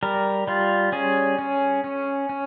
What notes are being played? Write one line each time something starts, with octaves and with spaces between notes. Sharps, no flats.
G3 A#4
G3 F4
C#4 G#4
C#4
C#4
C#4